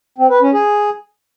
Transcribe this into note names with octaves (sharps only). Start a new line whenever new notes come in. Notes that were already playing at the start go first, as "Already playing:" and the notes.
C4
B4
C#4
G#4